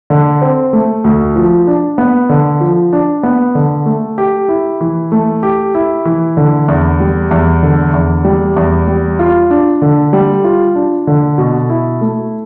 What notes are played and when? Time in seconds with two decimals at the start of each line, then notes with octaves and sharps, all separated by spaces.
0.10 D3
0.42 C4
0.73 A3
1.04 D2
1.36 F3
1.67 D4
1.98 B3
2.29 D3
2.61 F3
2.93 D4
3.23 B3
3.55 D3
3.86 A3
4.18 G4
4.48 E4
4.81 E3
5.12 A3
5.43 G4
5.75 E4
6.05 E3
6.37 D3
6.68 E2
7.00 G3
7.31 E2
7.63 D3
7.94 E2
8.25 G3
8.56 E2
8.88 G3
9.19 F4
9.50 D4
9.82 D3
10.13 G3
10.44 F4
10.75 D4
11.07 D3
11.38 B2
11.70 E4
12.01 A3